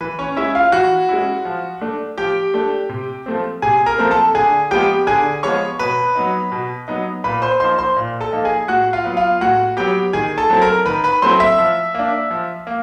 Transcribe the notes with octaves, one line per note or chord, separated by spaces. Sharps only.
E3 B4
C#4 C#5
G#3 C#4 E4 E5
F4 F5
E3 F#4 F#5
G#3 C#4 E4
F3
A3 D4
F3 G4 G5
A3 D4
C3
F3 A3 C4
C3 G#4 G#5
A#4 A#5
F3 A3 C4
A4 A5
D3 G#4 G#5
F3 G#3 B3 G4 G5
D3 G#4 G#5
F3 G#3 B3 C#5 C#6
B2 B4 B5
F#3 B3 D#4
B2
F#3 B3 D#4
A#2 B4 B5
C5 C6
F3 A#3 D#4 C5 C6
C5 C6
A#2
A4 A5
F3 A#3 D#4
G#4 G#5
A2 F#4 F#5
F4 F5
F#3 B3
F4 F5
A2 F#4 F#5
F#3 B3 G4 G5
D#3 G#4 G#5
A4 A5
F#3 A3 C4 E4 A5
A#4 A#5
D#3 B4 B5
B4 B5
F#3 A3 C4 E4 C5 C6
E5 E6
F3
A#3 D4
F3
A#3